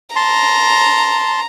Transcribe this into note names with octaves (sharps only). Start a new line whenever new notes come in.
A5 A#5 C6